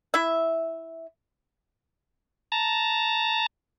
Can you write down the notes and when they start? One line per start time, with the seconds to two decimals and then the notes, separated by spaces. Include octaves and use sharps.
0.14 E4 E5
2.52 A5 A#5